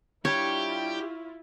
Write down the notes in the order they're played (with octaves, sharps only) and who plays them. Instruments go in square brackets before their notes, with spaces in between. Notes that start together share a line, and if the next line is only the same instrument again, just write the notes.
[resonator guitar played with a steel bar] G3 D4 [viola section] E4 F4 [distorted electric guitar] G4 [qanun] C#5